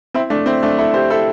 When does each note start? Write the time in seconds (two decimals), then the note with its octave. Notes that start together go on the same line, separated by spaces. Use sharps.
0.14 C4 E4
0.30 A3 D4
0.46 C4 E4
0.63 A3 D4
0.78 E4 A4
0.94 G4 C5
1.10 E4 A4